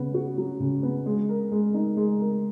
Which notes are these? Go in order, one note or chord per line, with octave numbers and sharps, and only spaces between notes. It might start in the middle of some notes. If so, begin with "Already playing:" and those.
Already playing: C#3 B3
F#4
F#3
C#3
B3
G#3
A#4
G#3
D#4
G#3
A#4